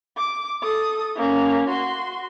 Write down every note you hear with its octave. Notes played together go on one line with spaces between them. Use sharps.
D6
A4 D#6
A#3 C#4
F#4 C6